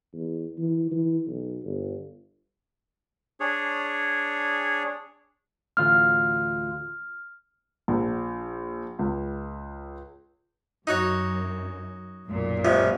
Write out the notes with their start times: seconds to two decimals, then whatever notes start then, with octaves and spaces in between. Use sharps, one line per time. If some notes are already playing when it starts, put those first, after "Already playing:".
0.14 E2
0.58 E3
0.91 E3
1.27 B1
1.63 G1
3.40 D4 G#4 C#5
5.77 A1 D2 F4 F6
7.88 A#1
8.99 C#2
10.87 F#2 D#4 F#4 C#5
12.27 B1 F#2 A#2
12.65 C#2 C3 F3